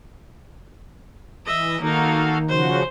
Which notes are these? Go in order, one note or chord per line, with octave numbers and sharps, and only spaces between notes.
E3 D#5 E5
D#3 A#3 D#4 F#4 A4 F5
C#3 F3 F#4 C5